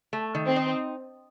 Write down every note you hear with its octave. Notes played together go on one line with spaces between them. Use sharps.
A3
D#3
C4
D#4